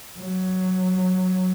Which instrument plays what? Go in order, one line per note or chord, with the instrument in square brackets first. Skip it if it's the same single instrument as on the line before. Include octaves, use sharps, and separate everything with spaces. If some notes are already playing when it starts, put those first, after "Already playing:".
[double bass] F#3